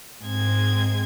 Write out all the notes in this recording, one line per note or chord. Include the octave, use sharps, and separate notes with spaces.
G#2 C4 G#4 G#6